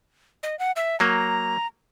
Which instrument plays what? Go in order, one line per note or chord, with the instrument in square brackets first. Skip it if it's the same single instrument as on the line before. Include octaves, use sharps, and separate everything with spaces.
[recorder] D#5
F#5
E5
[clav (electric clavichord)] F#3 A#3 [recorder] A#5